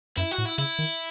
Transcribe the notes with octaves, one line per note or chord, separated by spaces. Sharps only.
F#2 E4
F#4
A2
E4
C#3 E4
D#3